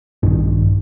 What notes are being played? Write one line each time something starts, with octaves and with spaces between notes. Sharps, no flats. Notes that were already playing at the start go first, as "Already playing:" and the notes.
A#1 G2 D#3